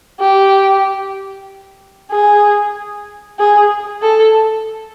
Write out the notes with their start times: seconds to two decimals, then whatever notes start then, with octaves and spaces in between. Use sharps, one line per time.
0.20 G4
2.11 G#4
3.39 G#4
4.02 A4